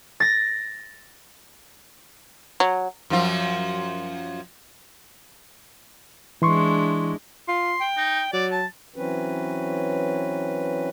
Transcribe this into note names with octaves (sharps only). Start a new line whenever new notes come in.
A6 A#6
F#3
F#2 F3 F4
E3 G#3 D4 E4 C6 C#6
F4 C6
G5
D#4
F#3 D5
A5
E3 F#3 C4 C#4 B4